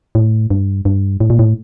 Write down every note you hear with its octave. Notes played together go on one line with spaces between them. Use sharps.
A2
G2
G2
A2
A#2
A2